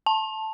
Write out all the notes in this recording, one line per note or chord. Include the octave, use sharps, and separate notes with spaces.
A5